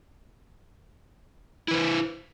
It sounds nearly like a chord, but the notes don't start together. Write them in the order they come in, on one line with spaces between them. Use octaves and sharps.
E4 B4 C5